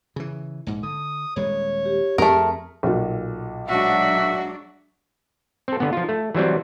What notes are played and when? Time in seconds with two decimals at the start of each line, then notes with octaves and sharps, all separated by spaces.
0.16 C#3 E3
0.67 A#1 G#2
0.83 D3 D#6
1.36 D#1 G3 G#3 C#5
1.86 G4
2.18 F2 F3 A3 C4 G#4 A#4
2.83 B1 A#2
3.68 F#3 G#3 D4 F#4 E5
5.68 C4 A4
5.80 D3 B3
5.93 F3 F4
6.09 A3
6.35 E3 F#3 G3 C4